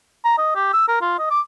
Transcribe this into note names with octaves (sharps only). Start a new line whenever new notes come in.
A#5
D#5
G4
E6
A#4
F4
D#5
D6